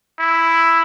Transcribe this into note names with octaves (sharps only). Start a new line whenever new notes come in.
E4